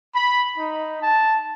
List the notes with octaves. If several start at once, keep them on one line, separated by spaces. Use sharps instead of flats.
B5
D#4
A5